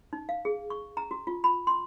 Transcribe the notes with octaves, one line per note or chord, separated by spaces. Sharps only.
D#4
F5
G#4
C#6
A#5
F#4
F4
B5
C6